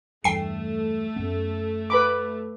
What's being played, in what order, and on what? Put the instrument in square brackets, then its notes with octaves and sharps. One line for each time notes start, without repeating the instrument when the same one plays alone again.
[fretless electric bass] E2 G2 [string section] A3 [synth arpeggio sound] G5 C7
[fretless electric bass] F#2 B3
[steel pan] B4 B5 D6